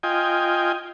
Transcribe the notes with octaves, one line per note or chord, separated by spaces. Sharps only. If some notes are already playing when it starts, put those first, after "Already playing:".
F4 D#5 G5 G#5